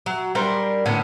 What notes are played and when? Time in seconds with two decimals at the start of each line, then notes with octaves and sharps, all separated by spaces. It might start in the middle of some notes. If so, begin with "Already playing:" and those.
0.06 F#3
0.35 G3 D4 A#4 C5
0.86 A2 D3 B3 C#4